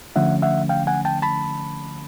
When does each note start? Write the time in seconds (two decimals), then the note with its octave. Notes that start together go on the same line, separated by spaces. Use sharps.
0.16 D3 F3 A3 C#4 E5 F#5
0.42 E5 F#5
0.69 F5 G5
0.87 F#5 G#5
1.05 G5 A5
1.22 A5 B5